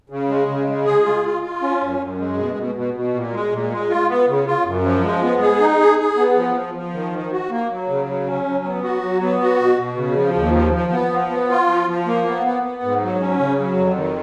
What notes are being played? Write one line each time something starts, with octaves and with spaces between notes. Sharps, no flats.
C#3
G#3
C#3
G#3
G#4
F4
F4
F4
C#4
F#2
F#2
G#3
B2
B2
B2
B2
A#2
G#3
A#2
G#3
F4
B3
C#3
F4
F#2
F3
G#3
B3
G#4
D#4
G#4
G#4
B3
F3
F3
F3
D#3
D#3
F#4
A#3
F#3
C#3
F#3
C#4
F#3
B3
F#4
F#3
B3
F#4
B2
B2
C#3
F3
D#2
F3
F3
B3
F3
B3
F4
F3
F3
A#3
B3
B3
B3
G#2
F#3
C#4
C#3
F#3
F2
D#3